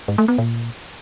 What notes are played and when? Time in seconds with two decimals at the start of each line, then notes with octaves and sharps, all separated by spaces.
0.08 G#2
0.18 A3
0.28 B3
0.38 A#2